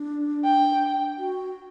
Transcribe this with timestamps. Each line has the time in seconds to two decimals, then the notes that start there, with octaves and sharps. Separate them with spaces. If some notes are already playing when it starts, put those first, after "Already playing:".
Already playing: D4
0.44 G5
1.18 F#4